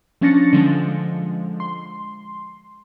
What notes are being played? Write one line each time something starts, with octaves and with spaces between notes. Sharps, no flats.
F3 C#4 D4 A6 A#6 C#7
D3 F3 G#3
C6